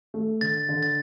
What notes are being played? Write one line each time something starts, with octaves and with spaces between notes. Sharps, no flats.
A3
D3 A6
D3
A6